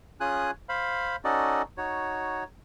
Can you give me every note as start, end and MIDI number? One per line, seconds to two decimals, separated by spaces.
0.20 0.51 61
0.20 0.51 65
0.20 0.51 68
0.20 0.51 80
0.20 0.51 87
0.20 0.51 90
0.69 1.16 72
0.69 1.16 77
0.69 1.16 83
1.24 1.62 61
1.24 1.62 63
1.24 1.62 66
1.24 1.62 69
1.24 1.62 74
1.24 1.62 75
1.78 2.44 63
1.78 2.44 66
1.78 2.44 73